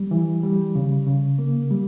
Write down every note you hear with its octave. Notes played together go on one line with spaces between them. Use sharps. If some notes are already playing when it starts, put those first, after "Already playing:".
Already playing: G3
E3
G3
C#3
C#3
A#3
G3